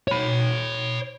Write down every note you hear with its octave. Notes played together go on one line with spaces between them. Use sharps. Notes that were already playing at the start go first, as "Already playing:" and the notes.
C#5 B5